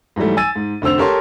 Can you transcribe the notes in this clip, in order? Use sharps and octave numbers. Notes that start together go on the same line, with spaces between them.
G#2 E3 F#3 G3 A3
G#5 E6 A6 D#7
G#2
F1 D3 C4 E6 F7
G4 A4 A#4 C#5 A5 C6